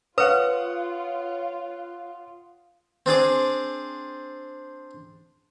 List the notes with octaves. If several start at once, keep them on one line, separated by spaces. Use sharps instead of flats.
F4 B4 C#5 F5 F#5 D#6
C4 D4 G#4 D6